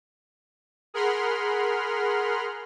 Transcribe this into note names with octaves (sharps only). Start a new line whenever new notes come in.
G#4 A#4 F#5 B5 C6 F6